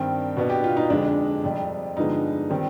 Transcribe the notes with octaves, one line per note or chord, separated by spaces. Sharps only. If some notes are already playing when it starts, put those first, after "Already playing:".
Already playing: G2 D#3 G3 C4 G5
B2 B3 D4
G4
F4
D#4
F2 D3 G#3 D4
F2 C3 G3
G2 D3 F3 G#3 B3 D#4
D#3 G3 C4